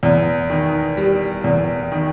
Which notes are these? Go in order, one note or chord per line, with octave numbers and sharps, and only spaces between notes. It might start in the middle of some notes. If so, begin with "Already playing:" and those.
E2
D#3
G3
E2
D#3